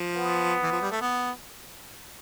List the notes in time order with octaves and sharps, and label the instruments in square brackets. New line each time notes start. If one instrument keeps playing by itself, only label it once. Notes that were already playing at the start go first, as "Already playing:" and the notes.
Already playing: [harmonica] F3
[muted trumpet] B3
[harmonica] E3
F3
G3
A3
B3